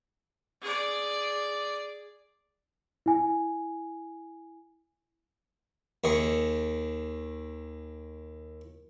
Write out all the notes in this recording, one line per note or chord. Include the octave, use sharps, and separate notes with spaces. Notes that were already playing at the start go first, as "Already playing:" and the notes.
G#4 D5
E4 G#5
D#2 D#3 G#4 C#6